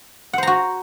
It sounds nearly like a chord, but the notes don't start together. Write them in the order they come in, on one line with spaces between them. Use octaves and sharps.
F#5 C5 A#5 F#4